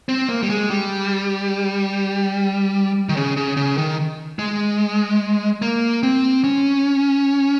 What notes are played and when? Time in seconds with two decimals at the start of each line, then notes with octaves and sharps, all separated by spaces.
0.09 C4
0.29 A#3
0.42 G3
0.50 G#3
0.70 G3
3.09 D#3
3.17 C#3
3.37 C#3
3.57 C#3
3.78 D#3
4.39 G#3
5.62 A#3
6.03 C4
6.44 C#4